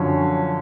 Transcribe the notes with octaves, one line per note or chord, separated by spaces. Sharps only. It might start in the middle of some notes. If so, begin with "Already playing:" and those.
Already playing: F#2 D3 F3 C#4